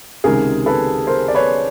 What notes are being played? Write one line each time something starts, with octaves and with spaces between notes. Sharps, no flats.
C#2 C3 D#3 G#3 G#4 A#4
A4 B4
A#4 C5
D5
B4 C#5